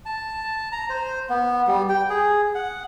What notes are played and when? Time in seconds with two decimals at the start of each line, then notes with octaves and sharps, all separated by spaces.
0.05 A5
0.72 A#5
0.90 C5
1.30 B3
1.67 G3
1.89 G5
2.10 G#4
2.55 F#5